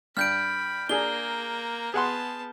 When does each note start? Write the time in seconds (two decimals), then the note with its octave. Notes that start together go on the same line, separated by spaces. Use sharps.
0.17 G2 B5 F6 G6 D7
0.89 A#3 D4 G#4 A#5 G7
1.94 B3 G#4 F#5 A5 C6